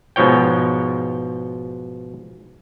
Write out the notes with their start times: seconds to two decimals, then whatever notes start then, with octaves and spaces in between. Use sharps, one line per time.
0.16 G#2 B2 F3 C#5 G5